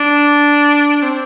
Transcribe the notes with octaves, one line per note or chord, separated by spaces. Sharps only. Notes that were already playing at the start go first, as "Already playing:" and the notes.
Already playing: D4
C4